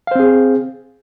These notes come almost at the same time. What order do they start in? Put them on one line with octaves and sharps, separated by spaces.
F5 C5 C4 G#4